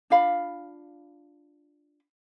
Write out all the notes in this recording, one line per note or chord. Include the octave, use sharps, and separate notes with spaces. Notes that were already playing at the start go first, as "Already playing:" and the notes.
D4 F4 F5 B5